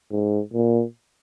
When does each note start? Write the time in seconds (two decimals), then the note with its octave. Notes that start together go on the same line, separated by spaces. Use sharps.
0.11 G#2
0.54 A#2